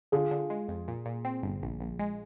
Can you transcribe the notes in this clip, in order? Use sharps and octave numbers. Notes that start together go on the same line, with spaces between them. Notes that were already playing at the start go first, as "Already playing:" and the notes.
D3 F4 G#4
D3
G#3
F2
A#2
A#2
C4
G1
A#1
A#1
G#3